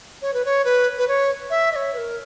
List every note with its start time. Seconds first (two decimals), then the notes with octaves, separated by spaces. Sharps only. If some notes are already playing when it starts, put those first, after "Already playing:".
0.22 C#5
0.34 B4
0.45 C#5
0.65 B4
0.98 B4
1.08 C#5
1.50 E5
1.72 D#5
1.76 C#5
1.94 B4
1.98 A#4